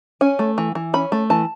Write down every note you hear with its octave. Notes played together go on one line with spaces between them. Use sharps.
C#4 G#5
A3
E3
E3
C#4 B5
A3
E3 A5